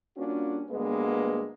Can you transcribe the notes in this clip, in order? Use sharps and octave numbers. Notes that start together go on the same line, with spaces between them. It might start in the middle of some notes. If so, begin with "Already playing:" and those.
G3 A#3 C#4 D4 F4 F#4
D2 G2 G#3 A#3 B3 B4